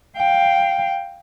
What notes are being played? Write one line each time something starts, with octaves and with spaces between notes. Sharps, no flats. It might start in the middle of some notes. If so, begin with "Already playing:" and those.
F5 G5